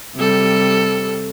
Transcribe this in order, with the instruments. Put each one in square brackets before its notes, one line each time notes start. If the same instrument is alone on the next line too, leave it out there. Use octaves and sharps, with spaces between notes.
[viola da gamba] C3 G3 A4